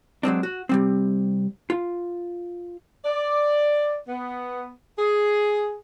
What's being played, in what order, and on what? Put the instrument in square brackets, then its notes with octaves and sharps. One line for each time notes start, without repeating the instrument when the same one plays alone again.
[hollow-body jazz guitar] F#3 G#3 C4 D4
F#4
C3 G3 C4
F4
[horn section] D5
B3
G#4